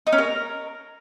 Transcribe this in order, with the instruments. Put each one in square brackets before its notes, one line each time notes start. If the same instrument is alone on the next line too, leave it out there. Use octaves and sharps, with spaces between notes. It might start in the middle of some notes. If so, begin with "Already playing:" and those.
[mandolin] D#4
C#4
A#4